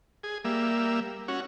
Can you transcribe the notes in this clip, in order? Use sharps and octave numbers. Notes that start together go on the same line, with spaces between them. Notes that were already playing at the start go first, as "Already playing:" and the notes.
G#4
G3 A#3 E5
C#4 F#4